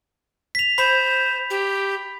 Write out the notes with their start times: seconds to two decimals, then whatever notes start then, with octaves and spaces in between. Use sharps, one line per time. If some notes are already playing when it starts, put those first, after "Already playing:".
0.55 B6 F7
0.78 C5 B5
1.50 G4